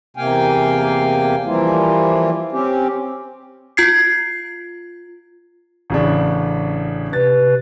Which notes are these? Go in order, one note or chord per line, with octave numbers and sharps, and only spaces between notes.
E2 C3 A#3 F5 G5 G#5
E3 F3 G3 A#3 E4 F4
C4 C#4 G4
F4 G#6 C7
A1 C#3 D4
C3 B4 A6